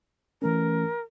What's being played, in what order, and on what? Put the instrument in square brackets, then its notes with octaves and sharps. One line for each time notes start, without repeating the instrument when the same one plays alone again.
[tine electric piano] E3 A3 C#4 [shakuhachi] A#4